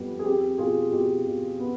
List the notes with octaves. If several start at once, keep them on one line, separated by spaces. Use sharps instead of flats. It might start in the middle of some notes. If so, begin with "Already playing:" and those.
Already playing: F2 G3 B3
G#4
C4 G4
B2 F4 G#4
B2 G4
B2
B3